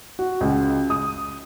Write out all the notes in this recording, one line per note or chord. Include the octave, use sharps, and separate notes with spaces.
F#4
C#2
D#6